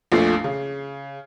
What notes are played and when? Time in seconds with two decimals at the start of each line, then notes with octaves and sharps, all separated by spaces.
0.12 A#1 F2 A#2 A3 C7
0.44 C#3